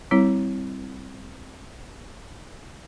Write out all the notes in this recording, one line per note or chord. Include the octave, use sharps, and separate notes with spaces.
G3 C4 E4 C#5